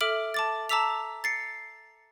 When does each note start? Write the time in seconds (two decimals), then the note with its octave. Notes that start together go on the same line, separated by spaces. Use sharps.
0.01 A4 E5 D6 F6 D7 F#7
0.34 A5 D6 A6
0.69 A5 A#5 D6 E6 B6 F7
1.24 A6 C7 C#7